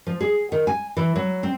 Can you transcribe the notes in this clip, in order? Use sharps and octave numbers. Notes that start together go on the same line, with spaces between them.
F3
G#4
D#3
G#5
E3
F#3
C4